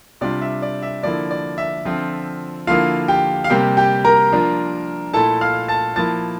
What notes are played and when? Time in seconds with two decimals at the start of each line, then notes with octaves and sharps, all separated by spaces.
0.21 C3 G3 D4 F4 D5
0.41 E5
0.62 D5
0.83 E5
1.03 D3 F3 A#3 E4 D5
1.31 D5
1.58 E5
1.85 D3 F3 C4 F4
2.67 D3 F3 A#3 E4 F4 F5
3.08 G4 G5
3.44 F5
3.50 C3 G3 A#3 G4 G5
3.77 G4 G5
4.05 A#4 A#5
4.32 F3 A#3 D4 F4
5.14 A#2 A3 E4 A4 A5
5.41 F5 F6
5.68 A5 A6
5.96 F3 A#3 E4 A5 A6